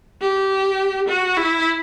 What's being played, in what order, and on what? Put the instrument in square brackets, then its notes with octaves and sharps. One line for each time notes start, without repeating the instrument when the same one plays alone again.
[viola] G4
F#4
E4